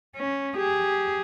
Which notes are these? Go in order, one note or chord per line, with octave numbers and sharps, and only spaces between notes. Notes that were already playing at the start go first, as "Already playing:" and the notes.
C#4
G4 G#4